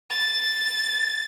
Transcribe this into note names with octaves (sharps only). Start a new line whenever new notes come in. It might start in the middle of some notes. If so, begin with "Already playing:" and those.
A6